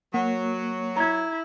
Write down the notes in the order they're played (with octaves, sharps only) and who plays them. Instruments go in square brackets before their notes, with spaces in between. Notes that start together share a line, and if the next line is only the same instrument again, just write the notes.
[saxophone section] F#3 [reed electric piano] A#3 [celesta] F#5
[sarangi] E4 [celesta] A#5 G#6